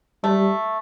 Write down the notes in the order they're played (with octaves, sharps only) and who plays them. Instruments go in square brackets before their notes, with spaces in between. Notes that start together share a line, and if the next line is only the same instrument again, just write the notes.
[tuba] G3 [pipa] A3